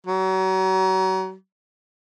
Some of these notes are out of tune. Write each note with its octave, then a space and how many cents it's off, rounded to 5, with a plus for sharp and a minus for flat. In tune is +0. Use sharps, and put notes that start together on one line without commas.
F#3 +35